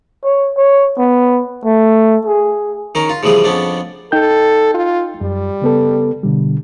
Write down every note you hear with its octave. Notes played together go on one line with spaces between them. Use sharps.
C#5
C#5
B3
A3
G#4
D#3 C#4 A#4
F4
C#3 E3 F3 G3 G#4
F2 B3 C#4 D4
D#4 A4 G5 G6
F4
F#2 G3
C#3 B3 A4
B2 D3 G3